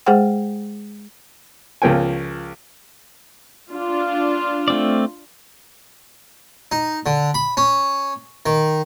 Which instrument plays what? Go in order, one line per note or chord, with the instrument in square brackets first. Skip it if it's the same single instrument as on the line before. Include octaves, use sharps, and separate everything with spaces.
[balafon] G#3 G#4 C5 F#5 G5
[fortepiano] C#2 F3 A#4 G5 G#5
[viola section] D4 F4
[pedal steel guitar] A3 C4 D5
[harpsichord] D#4
D3
B5
C#4
D#3